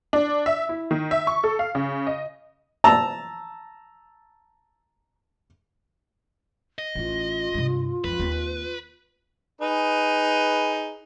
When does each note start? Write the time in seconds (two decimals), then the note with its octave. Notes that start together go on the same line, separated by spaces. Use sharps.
0.13 D4
0.46 E5
0.69 E4
0.91 D#3
1.11 E5
1.27 C#6
1.44 A4
1.59 F5
1.75 C#3
2.07 D#5
2.84 A5 A#5 E6
6.79 D#5
6.95 A1 E4 F4
7.54 G2 C3
8.04 F2 F3 B4
8.19 D#2 C4
9.61 D#4 G#4 B4